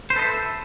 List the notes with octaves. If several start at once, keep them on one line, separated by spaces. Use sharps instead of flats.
A4 B4 C5 D#5 E5